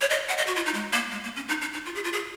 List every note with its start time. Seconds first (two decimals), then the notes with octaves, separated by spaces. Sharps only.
0.01 C#5
0.10 D#5
0.29 F#5
0.38 D#5
0.47 F#4
0.56 F4
0.66 D#4
0.74 G#3
0.93 A#3
1.12 G#3
1.24 A#3
1.36 C#4
1.49 D#4
1.61 D#4
1.73 D#4
1.86 F4
1.95 G#4
2.04 F4
2.13 G#4